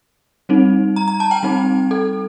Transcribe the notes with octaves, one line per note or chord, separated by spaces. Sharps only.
G3 C4 D#4
A#5
A#5
A5
G5
G3 C4 D#4
A4